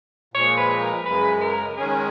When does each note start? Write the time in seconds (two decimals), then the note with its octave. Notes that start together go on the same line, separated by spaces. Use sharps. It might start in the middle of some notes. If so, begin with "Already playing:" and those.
0.34 A#2 F3 G#3 C#5
0.57 B4
0.81 A#4
1.06 F#2 C#3 G#3 B4
1.41 A#4
1.77 D#3 G#3 C#4 G#4